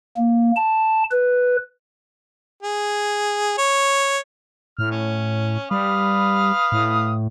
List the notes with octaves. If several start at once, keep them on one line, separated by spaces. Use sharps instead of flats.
A#3
A5
B4
G#4
C#5
A2 F6
C#4
G3 B4 F5 D#6
A2